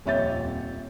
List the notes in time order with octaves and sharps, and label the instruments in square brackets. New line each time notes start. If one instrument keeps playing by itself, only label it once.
[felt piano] D#1 F2 C#5 E5 G6 A6